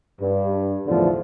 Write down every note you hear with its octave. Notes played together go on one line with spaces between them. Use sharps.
G2
B1 E2 A2 D3 F3